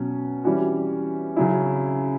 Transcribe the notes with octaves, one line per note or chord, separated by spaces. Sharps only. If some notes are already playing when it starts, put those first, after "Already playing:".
Already playing: B2 F#3 C#4
E3 G3 C#4 F#4
C#3 F#3 C#4 E4